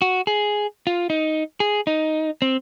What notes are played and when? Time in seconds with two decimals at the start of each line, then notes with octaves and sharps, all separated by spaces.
0.02 F#4
0.27 G#4
0.87 F4
1.10 D#4
1.60 G#4
1.87 D#4
2.42 C4